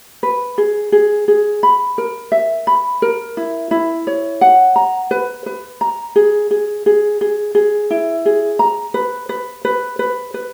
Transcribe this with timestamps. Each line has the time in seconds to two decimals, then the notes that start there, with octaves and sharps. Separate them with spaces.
0.23 B4
0.58 G#4
0.92 G#4
1.28 G#4
1.63 B5
1.98 A#4
2.32 E5
2.67 B5
3.02 A#4
3.37 E4
3.71 E4
4.07 C#5
4.41 F#5
4.76 A#5
5.11 B4
5.46 B4
5.81 A#5
6.16 G#4
6.51 G#4
6.86 G#4
7.21 G#4
7.55 G#4
7.90 E4
8.26 G#4
8.59 A#5
8.94 B4
9.29 B4
9.65 B4
9.99 B4
10.34 B4